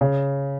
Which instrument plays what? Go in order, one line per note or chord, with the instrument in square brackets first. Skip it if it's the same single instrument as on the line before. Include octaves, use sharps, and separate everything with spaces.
[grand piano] C#3